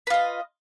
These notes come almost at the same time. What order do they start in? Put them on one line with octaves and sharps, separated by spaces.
B4 F4 D#5